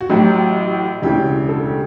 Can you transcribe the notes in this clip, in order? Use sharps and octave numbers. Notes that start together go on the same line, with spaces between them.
F#4
A1 A2 F#3 G4
E1 D2 C#3 E3 G4
A4
G4